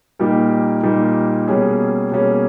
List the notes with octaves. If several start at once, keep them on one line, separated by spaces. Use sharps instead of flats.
A#2 G3 A#3 D#4 G4
A#2 G3 A#3 D#4 G4
B2 G3 A#3 C#4 G#4
B2 G3 A#3 C#4 G#4